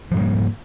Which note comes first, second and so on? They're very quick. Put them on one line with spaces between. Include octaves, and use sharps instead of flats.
F3 G#2 G3 A#3